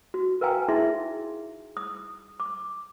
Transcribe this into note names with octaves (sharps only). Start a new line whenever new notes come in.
F#4
A#4 B4 F5 G5 G#5 A#5
D#4 E4 G#4 E5 C6
D#6
D6